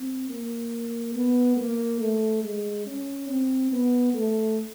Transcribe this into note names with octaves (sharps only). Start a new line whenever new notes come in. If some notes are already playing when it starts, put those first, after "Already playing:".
Already playing: C4
A#3
B3
A#3
A3
G#3
C#4
C4
B3
A3